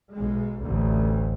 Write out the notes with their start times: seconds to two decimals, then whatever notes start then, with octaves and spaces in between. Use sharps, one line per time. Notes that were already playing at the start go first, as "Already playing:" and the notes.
0.12 B1 G#3
0.61 A1 D2